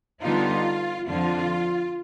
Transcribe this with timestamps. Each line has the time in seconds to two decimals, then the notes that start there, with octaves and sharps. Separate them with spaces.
0.22 D3 G3 B3 D#4 F4
1.08 F2 D3 F3 F4